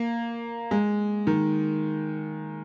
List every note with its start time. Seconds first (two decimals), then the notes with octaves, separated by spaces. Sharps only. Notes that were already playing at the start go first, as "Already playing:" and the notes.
Already playing: A#3
0.71 G#3
1.27 D#3